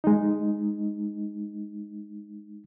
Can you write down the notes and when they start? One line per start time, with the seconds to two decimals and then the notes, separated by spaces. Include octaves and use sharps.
0.04 G#3 D#4